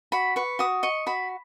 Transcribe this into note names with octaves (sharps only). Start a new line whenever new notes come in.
F#4 B5
B4 C#6
F#4 D#6
D#5 C#6
F#4 B5